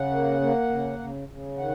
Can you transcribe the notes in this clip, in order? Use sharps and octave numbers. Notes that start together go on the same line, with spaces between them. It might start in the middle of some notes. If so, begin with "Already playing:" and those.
Already playing: C#3 F#5
A#3
A#3
C#3
C#3
C#3
D#3 F#5